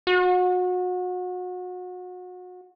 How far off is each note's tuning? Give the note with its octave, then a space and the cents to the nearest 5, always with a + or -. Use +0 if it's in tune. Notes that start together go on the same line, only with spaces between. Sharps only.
F#4 -30